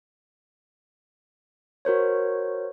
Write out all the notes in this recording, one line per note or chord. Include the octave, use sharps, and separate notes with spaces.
F#4 A#4 C5 C#5